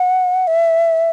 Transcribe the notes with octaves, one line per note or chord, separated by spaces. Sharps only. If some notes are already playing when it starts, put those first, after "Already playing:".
Already playing: F#5
E5